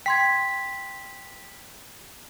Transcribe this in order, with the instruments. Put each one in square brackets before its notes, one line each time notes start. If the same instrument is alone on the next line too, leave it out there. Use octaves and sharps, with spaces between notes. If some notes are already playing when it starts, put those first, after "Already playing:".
[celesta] G5 C6 G#6 [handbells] B6